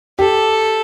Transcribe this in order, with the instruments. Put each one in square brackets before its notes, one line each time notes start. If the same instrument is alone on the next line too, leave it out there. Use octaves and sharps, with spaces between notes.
[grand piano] G4 [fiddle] A4